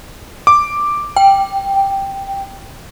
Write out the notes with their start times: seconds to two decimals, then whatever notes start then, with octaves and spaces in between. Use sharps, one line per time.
0.47 D6
1.17 G5